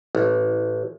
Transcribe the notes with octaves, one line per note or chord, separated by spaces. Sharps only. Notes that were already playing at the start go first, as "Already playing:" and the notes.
A1